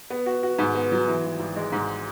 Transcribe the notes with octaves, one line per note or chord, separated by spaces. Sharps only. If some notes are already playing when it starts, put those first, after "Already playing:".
B3
F#4
F#4
G#2
B3
F#3
E3
G#1
G#1
G#3
G#2